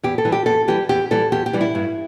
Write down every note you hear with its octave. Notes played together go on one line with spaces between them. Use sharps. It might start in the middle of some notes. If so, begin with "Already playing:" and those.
E2 G4
A4
E3 G3
G4
E2 A4
E3 G3 G4
E2 G4
E3 G3 A4
E2 G4
G4
E3 G3
E4
G2